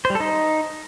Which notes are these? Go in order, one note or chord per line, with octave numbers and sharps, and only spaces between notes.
C5
G3
A4
D#4